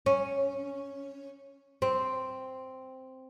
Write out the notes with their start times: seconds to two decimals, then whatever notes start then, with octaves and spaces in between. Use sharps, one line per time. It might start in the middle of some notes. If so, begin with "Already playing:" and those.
0.06 C#4
1.82 C4